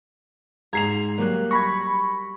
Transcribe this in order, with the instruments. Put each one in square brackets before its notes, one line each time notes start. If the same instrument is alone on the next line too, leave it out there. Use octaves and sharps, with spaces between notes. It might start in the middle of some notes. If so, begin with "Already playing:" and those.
[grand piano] G#2 C7 F7 [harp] A#5 G#6
[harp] F#3 G3 F#6 [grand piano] A#3
[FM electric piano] B5 C#6 [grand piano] G#6 A#6